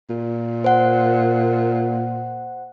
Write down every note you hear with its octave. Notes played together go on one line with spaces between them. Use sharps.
A#2
C5 F#5